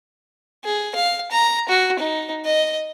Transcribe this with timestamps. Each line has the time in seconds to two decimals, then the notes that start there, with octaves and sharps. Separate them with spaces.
0.65 G#4
0.95 F5
1.31 A#5
1.69 F#4
1.99 D#4
2.45 D#5